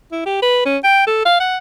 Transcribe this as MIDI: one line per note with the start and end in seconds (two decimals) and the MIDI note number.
0.12 0.25 64
0.26 0.40 67
0.42 0.63 71
0.65 0.77 61
0.84 1.04 79
1.07 1.22 69
1.25 1.40 77
1.40 1.57 78